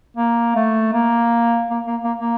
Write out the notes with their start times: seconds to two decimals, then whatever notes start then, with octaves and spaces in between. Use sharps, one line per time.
0.17 A#3
0.56 A3
0.93 A#3
1.70 A#3
1.87 A#3
2.04 A#3
2.21 A#3